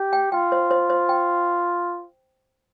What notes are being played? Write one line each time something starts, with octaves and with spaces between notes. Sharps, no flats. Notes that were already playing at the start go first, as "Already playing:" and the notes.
Already playing: G4
G5
F4 G5
C5
C5
C5
G5